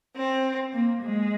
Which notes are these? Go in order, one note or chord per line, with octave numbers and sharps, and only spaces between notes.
C4
A#3
G#3